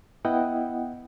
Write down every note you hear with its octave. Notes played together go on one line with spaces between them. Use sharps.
B3 E4 D#5 F#5 G5